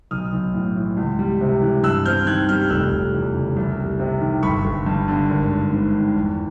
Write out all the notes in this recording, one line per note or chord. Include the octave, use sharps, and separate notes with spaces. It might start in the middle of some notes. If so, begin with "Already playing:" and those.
B1 D#6 F6
B1
A2
E3
C#2
G3
C3
E3
G2 E6 F#6
C4 F6 G6
D#3 F#6 G#6
G3 F6 G6
F1 E6 F#6
F1
E2
C#3
C2
G3
C3
D#3
G1 B5 C#6
G1
G2
D3
G#1
G#1
G#2
D#3
E2